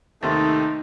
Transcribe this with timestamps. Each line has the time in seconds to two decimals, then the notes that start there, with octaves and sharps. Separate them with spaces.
0.23 D#2 C3 D#3 A3 D#4 C6 A6